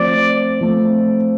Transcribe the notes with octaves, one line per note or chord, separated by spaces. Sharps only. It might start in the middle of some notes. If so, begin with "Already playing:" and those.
Already playing: F3 A3 C4 D5
F3 A3 C4